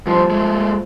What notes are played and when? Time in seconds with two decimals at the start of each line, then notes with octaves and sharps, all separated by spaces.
0.07 G2 F3 C5
0.31 G#3 A3